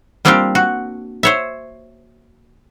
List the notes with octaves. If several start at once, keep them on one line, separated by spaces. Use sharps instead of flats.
G3 A#3 C4 D4 F4 G4
F#4
C5 C#5 E5